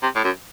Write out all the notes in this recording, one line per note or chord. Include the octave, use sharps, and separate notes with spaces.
C3
A2
F#2